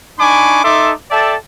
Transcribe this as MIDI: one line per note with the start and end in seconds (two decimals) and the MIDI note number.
0.18 0.61 62
0.18 0.61 63
0.18 0.61 80
0.18 0.61 83
0.18 0.61 85
0.18 0.61 86
0.63 0.91 63
0.63 0.91 69
0.63 0.91 76
0.63 0.91 81
0.63 0.91 84
0.63 0.91 86
1.10 1.35 69
1.10 1.35 74
1.10 1.35 76
1.10 1.35 79
1.10 1.35 81